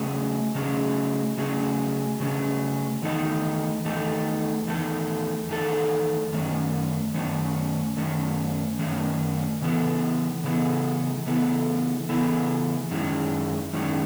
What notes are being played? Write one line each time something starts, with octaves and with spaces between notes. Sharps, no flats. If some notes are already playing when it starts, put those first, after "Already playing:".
Already playing: C#3 F#3 A3 C#4 G#4
C#3 F#3 A3 C#4 G#4
C#3 F#3 A3 C#4 G#4
C#3 F#3 A3 C#4 G#4
E2 D#3 A3 D#4 A4
E2 D#3 A3 D#4 A4
E2 D#3 A3 D#4 A4
E2 D#3 A3 D#4 A4
F#2 D#3 A3 C#4
F#2 D#3 A3 C#4
F#2 D#3 A3 C#4
F#2 D#3 A3 C#4
C#3 E3 B3 E4 A4
C#3 E3 B3 E4 A4
C#3 E3 B3 E4 A4
C#3 E3 B3 E4 A4
F#2 D#3 G#3 C#4 E4
F#2 D#3 G#3 C#4 E4